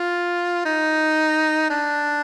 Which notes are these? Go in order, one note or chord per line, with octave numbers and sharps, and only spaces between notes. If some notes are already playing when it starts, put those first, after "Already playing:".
Already playing: F4
D#4
D4